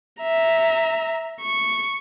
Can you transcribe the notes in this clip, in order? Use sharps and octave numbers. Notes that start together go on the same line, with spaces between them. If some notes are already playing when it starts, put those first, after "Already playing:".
E5 A#5
C#6